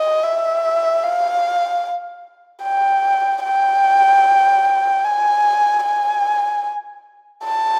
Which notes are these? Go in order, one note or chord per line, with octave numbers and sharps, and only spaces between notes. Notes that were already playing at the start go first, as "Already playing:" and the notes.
Already playing: D#5
E5
F5
G5
G5
G#5
G#5
A5